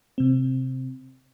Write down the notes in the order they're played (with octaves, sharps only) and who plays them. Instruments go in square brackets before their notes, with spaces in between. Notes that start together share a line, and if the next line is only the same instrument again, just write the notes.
[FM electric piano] C3 C4